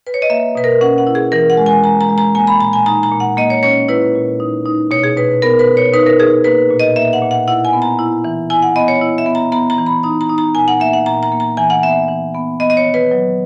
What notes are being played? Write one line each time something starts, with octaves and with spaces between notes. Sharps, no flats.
B4
C#5
D#5
A#3 E5
B2 B4
A#4
C#4 F#5
F#5
E4
G#4
E3 A#4
F#5
G#3
G#5
G#3 A#5
A#5
G#3
A#5
A#3 G#5
B5
A#2 A#5
G#5
D#4 A#5
A#5
A#2
F#5
A#3 D#5
C#5
C#4 C#5
E4 B4
A#2
D#4
D#4
B2 C#5
G#4
B2 B4
B3 A#4
B4
B2
C#5
D#4 B4
A#4
D#4 G#4
A#3 B4
A#2
D#5
A#3 E5
F#5
A#2
F#5
E4 F#5
G#5
B3
A#5
E4
E3
E4 G#5
F#5
B3 D#5
C#5
E4
E5
B3
A#5
B3 A#5
A#5
E3
B5
D#4 A#5
A#5
D#4
A#5
A#2 G#5
F#5
A#3 E5
F#5
A#2 A#5
A#5
A#3
A#5
E3 G#5
F#5
B3 E5
E3
B3
B3 D#5
D#5
C#5
D#3
B4
F#3